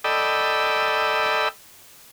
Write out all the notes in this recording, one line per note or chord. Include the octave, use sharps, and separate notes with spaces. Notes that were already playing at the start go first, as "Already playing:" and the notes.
A4 D5 D#5 G5 B5 E6